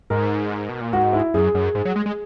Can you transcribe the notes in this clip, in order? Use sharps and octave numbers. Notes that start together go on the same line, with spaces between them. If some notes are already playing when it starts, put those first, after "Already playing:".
G#2 A#4
B2
A#2
G#2 F#4
E4
F#2 G#4
F#2
G#2
F#3
G#3
G#3